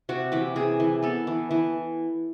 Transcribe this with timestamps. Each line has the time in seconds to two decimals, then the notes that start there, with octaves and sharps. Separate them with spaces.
0.09 C3 F#4
0.32 E3 G4
0.56 C3 G#4
0.80 E3
1.03 B3 A4
1.27 E3
1.51 E3